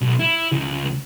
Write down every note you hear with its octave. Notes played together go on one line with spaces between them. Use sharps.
B1
E4
C#2